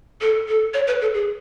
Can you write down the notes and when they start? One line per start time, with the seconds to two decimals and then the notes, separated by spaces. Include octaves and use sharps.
0.21 A4
0.48 A4
0.74 C#5
0.87 B4
1.01 A4
1.14 G#4